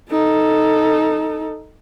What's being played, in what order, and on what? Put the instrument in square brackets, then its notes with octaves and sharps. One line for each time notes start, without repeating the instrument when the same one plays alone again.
[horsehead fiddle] D#4 A4